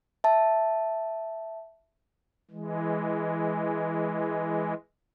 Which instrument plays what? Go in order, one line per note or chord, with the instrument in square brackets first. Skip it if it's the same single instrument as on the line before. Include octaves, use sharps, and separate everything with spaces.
[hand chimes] E5 A5
[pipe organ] E3 G#3